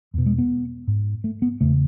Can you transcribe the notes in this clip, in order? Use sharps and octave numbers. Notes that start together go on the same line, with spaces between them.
E2 B2
G#3
B3
G#2
A3
B3
E2 C#3 A3